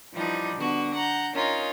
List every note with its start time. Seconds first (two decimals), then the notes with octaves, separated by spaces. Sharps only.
0.14 E3 F3 G3 D4 D#4
0.56 D3 B3 F#4
0.93 F#5 A#5 G6
1.35 C#4 D#4 F4 A#4